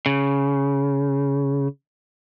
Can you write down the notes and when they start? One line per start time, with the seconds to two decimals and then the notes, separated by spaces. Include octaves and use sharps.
0.06 C#3